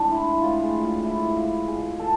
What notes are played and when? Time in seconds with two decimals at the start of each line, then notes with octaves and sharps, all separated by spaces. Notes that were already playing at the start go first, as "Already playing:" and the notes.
Already playing: A2 E3 G#3 C4 D4
0.11 E4
0.42 A2 G#3 F4
0.64 G#4
0.84 F4
1.05 E4
1.37 F4
1.68 B2 G#3 G#4
1.99 A4